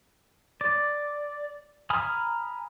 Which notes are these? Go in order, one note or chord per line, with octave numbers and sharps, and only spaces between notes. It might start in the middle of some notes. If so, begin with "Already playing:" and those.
D5
G#5 A#5 B5 D#6 F6